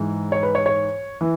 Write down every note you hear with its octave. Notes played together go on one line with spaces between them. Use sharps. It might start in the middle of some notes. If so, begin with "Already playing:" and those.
Already playing: G#2 E3 G#3
C#5
B4
C#5
C#5
E3